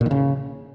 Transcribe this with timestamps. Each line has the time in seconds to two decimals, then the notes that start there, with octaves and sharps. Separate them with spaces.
0.01 A#2
0.06 D#3
0.11 C#3